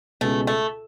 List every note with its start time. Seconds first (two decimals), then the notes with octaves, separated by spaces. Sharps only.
0.21 C#2 B2 G#3 A3 C#4
0.47 A3